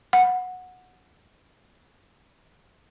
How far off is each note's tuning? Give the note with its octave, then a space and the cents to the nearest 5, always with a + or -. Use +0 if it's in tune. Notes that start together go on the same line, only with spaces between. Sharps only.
F#5 -15